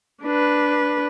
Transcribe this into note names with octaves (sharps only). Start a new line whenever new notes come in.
D4 B4